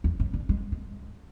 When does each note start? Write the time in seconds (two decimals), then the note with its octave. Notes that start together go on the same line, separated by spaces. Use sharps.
0.04 E2
0.20 F#2
0.34 D3
0.49 G#3
0.72 G#3